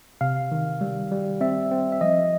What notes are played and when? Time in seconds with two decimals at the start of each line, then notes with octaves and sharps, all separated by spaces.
0.21 C3 F5
0.52 D#3
0.81 G3
1.11 G3
1.41 C4 E5
1.71 C4
1.92 E5
2.01 F3 D#5